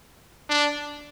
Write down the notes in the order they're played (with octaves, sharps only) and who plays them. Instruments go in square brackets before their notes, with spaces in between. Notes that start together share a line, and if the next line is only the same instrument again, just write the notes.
[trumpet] D4